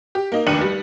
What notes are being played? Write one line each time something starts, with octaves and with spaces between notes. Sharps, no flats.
G4
A#3 D#4
F1 D#2 D4 C#7 D#7 F#7
G3